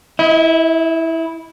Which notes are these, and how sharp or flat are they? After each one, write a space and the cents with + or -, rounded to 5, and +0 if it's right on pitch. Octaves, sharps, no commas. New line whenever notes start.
E4 -10 D#5 +40